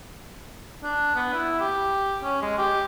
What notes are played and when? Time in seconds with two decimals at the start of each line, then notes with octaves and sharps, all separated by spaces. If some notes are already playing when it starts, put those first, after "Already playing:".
0.83 D4
1.15 B3
1.34 E4
1.60 G4
2.24 C#4
2.42 G#3
2.58 G4